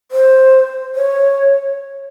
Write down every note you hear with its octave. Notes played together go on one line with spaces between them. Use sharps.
C5
C#5